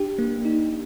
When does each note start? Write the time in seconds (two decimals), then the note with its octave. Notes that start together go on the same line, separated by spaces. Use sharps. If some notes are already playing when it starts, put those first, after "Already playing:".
Already playing: D4 G4
0.19 A#3
0.45 D#4